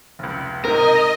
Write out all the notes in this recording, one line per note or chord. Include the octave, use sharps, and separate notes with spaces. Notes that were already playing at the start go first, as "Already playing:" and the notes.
F1 C#2
G#2 C3 A#4 D#5